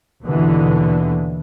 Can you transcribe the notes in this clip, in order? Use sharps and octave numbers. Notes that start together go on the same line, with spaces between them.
D#2 B2 D3 E3